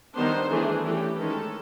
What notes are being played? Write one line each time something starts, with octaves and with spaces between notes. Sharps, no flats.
D#3 G3 B3 D4 C5
E3 A3 D4 G#4
E3 A3 C#4 G4
D#3 G#3 C#4 A4